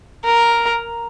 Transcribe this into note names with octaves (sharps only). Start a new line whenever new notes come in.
A#4